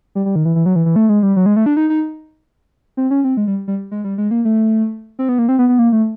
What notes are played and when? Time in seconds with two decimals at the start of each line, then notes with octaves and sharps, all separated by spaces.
0.15 G3
0.26 G3
0.36 D#3
0.45 E3
0.56 E3
0.66 F#3
0.76 E3
0.86 E3
0.96 A3
1.09 G#3
1.23 G3
1.36 F#3
1.46 G#3
1.56 A3
1.66 D4
1.77 D#4
1.90 D#4
2.97 C4
3.11 C#4
3.24 C4
3.37 G#3
3.47 G3
3.68 G3
3.91 G#3
4.04 G3
4.18 G#3
4.31 A#3
4.45 A3
5.19 C4
5.29 B3
5.39 A#3
5.49 C4
5.59 B3
5.69 B3
5.79 A#3
5.92 A3